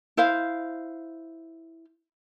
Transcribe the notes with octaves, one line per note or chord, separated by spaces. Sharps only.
E4 C5 F5